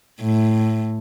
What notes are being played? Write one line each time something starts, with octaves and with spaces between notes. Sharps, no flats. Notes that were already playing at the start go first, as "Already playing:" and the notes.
A2